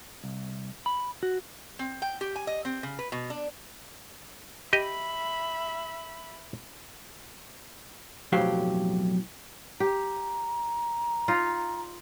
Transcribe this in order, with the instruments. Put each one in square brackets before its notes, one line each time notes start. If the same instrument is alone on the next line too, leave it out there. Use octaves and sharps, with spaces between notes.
[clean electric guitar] C2
B5
F#4
[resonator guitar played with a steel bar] C4
G5
G4
G#5
D#5
C4
C#3
B4
B2
D4
[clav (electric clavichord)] G4 D#5 [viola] E5 B5
[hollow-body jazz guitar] B1 F2 A2 F#3 G4 F5
[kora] G4 [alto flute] A#5
[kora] D#4 F4